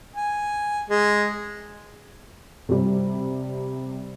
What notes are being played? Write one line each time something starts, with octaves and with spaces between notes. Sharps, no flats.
G#5
G#3
C3 G3